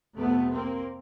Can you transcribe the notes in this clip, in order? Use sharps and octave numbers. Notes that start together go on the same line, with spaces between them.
F2 C3 A3 B3
A#3 C4